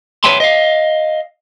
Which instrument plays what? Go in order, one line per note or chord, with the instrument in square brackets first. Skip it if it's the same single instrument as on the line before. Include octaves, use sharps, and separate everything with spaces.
[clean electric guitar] B4 C#5 E5 G5 A5 C6
D#5 F5